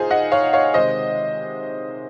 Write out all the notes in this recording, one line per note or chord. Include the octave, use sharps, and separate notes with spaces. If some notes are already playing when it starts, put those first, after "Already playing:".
Already playing: A#2 D#4 F4 G#4 C5
D#5 F#5
C#5 F5
C#5 F5
C3 D#3 G#3 C4 C5 D#5